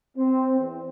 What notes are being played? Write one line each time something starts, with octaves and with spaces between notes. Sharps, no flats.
C4
E2